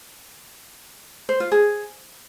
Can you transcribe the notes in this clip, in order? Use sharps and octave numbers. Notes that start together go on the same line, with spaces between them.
C5
F4
G#4